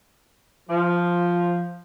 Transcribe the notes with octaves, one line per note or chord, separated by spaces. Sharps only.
F3